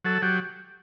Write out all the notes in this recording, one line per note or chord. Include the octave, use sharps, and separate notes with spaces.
F#3 A4
F#3 G4